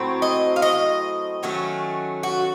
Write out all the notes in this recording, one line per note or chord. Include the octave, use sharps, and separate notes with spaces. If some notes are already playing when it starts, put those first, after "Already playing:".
Already playing: A2 F#3 C4
D#5
F5
D#5
D#3 F#3 A3 C#4
F#4